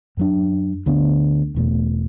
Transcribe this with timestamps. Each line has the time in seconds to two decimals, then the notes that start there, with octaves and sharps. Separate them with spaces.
0.17 F#2 F#3 D4
0.86 D2 D3 B3 D4
1.55 E1 E2 B2 A3